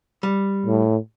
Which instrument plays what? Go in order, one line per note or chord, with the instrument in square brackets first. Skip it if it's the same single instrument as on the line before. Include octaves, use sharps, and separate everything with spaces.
[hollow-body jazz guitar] G3
[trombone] A2